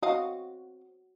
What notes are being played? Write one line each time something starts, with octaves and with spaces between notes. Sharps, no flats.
C4 F#4 D#5 F5